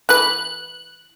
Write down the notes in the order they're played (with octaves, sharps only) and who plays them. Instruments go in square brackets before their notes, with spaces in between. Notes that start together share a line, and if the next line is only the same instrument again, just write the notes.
[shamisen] E3 B4 [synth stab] F#6